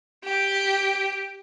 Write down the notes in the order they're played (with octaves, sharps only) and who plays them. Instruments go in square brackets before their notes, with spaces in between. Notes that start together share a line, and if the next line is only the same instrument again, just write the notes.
[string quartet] G4